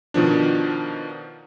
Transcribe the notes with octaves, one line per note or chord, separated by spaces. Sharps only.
B2 D#3 F3 D4